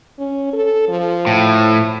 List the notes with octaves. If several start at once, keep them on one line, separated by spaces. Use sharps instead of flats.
C#4
A4
F3
A2